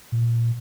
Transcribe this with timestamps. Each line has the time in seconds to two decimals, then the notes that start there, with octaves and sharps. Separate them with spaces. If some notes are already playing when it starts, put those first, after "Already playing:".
0.12 A#2